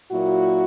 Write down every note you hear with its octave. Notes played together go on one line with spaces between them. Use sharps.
A#2 F#3 A#3 E4 F#4